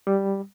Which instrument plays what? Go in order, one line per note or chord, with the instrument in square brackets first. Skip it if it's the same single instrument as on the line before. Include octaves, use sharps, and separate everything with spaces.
[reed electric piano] G3